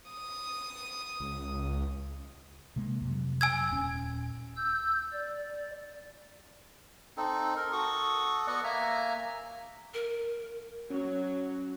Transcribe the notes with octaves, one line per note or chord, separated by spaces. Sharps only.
D#6
C#2
C3 G#3 A#3
F2 C3 F#3
G#5 E6 G#6
D#1 C#4
E6 G6
D5
C4 D#4 A4
A#4
F#4 A4 C#6 D#6
B3 D5 D#5 F#5
A#3 E5 G#5 A#5
A#4
F#3 C#4